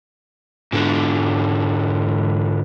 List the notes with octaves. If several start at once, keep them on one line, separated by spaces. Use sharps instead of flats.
G#2 D3